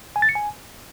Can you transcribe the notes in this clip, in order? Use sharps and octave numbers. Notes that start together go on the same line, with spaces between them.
G#5
A6
C#7
G#5